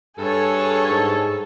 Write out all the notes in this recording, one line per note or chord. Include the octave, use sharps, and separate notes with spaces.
G2 G#4 A4 C#5
G#2